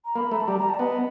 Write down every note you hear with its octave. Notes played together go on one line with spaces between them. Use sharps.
A#5
A#3 B5
A3 A#5
A5
G3 A#5
A#5
A5
D5
B3 D#5